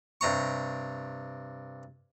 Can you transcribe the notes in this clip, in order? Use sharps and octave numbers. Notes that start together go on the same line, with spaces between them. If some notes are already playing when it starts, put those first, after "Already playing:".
G2 C3 A#5 C#6